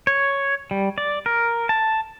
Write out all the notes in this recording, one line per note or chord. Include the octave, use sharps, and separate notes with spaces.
C#5
G3
D5
A#4
A5